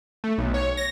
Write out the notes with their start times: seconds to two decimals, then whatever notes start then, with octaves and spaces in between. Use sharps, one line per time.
0.24 A3
0.38 B1
0.54 C#5
0.77 A#6